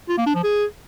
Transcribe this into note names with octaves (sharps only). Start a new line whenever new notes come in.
F4
A#3
D4
F3
G#4